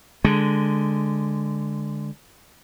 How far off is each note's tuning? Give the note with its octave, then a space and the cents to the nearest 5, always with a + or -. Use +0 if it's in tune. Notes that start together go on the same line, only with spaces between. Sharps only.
D3 +0 G#3 -5